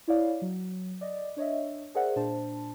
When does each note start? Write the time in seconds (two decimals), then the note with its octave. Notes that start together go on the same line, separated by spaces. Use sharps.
0.08 E4 C#5 D5 F5
0.42 F#3
1.01 D5 D#5
1.37 D4 C#5 D#5 E5
1.95 G#4 A#4 C5 D5 E5 F#5
2.16 A#2 D4 C5 A5